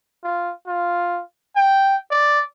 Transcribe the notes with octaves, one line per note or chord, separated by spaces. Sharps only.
F4
F4
G5
D5